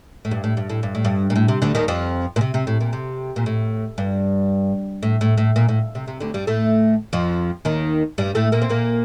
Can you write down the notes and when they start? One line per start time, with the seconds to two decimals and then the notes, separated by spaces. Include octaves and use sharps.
0.25 A2
0.31 G2
0.44 A2
0.57 G2
0.70 A2
0.83 G2
0.95 A2
1.05 G2
1.30 A#2
1.36 A2
1.48 C3
1.62 D2 D3
1.75 D#2 D#3
1.88 F2 F3
2.36 A#2
2.41 C3
2.54 C3
2.67 A2
2.81 A#2
2.93 C3
3.36 A#2
3.46 A2
3.98 G2
5.03 A2
5.21 A2
5.37 A2
5.56 A#2
5.69 A2
5.95 C3
6.08 C3
6.20 D2 D3
6.34 G2 G3
6.47 A2 A3
7.13 F2 F3
7.65 D#2 D#3
8.18 G2 G3
8.35 A2 A3
8.52 A#2 A#3
8.62 C4
8.70 A#2 A#3